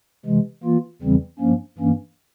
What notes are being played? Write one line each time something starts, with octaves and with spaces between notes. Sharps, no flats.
C3 E3 G#3
E3 A#3 F4
E2 C#3 E3 G3 C4
G2 F3 A#3 C#4
G2 E3 A#3 C#4